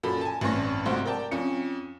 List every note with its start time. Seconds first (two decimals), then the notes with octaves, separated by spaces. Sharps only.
0.03 F#2 A#2 A4 B5
0.21 G#5 A5
0.41 A1 G2 C4 C#4 C#6 A#6
0.86 F1 F2 G#2 F#4 C5
1.05 A#4 D5 G5 A5
1.31 F2 C#4 C#7